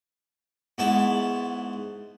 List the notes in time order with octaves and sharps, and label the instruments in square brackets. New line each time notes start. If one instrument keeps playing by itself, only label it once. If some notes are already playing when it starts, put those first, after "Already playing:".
[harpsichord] G#2 B3 E4 A5 C#6